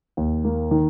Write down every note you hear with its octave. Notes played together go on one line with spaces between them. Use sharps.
D#2
A#3
D#3